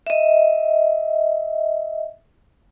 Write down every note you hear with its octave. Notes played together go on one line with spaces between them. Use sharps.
D#5 E5